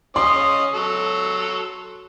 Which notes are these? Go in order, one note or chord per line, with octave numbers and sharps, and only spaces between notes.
C#4 D#5 C6
F#3 A4